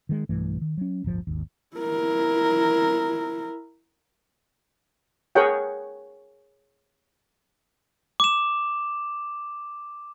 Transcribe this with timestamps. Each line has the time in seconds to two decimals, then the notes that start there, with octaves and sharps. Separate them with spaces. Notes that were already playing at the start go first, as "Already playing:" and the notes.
0.09 D#3 G#3
0.29 B1 G2 E3 A3
0.61 D#3
0.77 F#3 C#4
1.04 D1 G1 F3
1.27 G#1 D#2
1.77 E4 A#4
5.35 G#4 A#4 C#5 F#5 G5
8.20 D6 E7